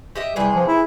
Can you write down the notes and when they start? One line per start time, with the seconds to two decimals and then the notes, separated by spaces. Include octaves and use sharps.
0.15 G4 D#5 E5
0.36 C3 E3 G3 G#4
0.55 F3
0.68 E4